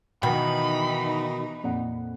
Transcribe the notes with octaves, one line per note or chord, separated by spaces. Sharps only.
B2 D#3 E3 D#4 F#5 G5 B5
F2 A#2 F#5